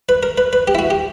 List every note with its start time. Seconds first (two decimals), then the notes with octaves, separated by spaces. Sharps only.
0.09 B4
0.23 A#4
0.38 B4
0.53 B4
0.68 G4
0.75 E4
0.79 F#4
0.90 G4